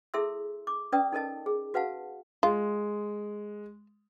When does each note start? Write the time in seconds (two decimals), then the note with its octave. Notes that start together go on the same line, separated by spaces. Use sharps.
0.14 E4 G#4 A4 E5 C6 E6
0.67 D6
0.92 C#4 B4 D5 G5 D#6
1.12 D#4 A4 A#4 D#5 A5
1.46 G#4
1.74 F#4 B4 F5 F#5 A5
2.43 G#3 F4